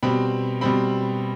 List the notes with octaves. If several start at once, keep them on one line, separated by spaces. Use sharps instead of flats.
B2 G3 C4 B5
B2 G3 C4 B5